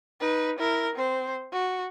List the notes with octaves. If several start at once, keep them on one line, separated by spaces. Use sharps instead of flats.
D#4 B4
E4 A#4
C4 C5
F#4